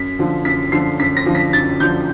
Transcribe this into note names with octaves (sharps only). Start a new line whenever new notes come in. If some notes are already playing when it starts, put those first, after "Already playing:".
Already playing: F#2 B6
D3 F3
F#2 B6
D3 F3 C7
F#2 B6
A#6
D3 F3
B6
F#2 A6
D3 F3 G6